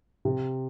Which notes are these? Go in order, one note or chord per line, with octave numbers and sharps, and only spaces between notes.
C3